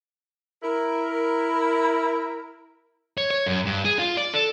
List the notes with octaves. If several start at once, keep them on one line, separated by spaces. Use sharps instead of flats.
E4 A#4
C#5
C#5
F#2
G2
G#4
F4
D5
A4